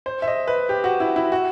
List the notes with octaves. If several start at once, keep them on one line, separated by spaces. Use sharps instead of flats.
C5
E5
D#5
B4
G4
F#4
E4
E4
F#4